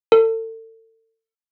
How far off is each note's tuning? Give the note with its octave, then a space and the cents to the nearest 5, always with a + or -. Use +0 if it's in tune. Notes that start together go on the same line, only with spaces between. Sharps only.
A4 +35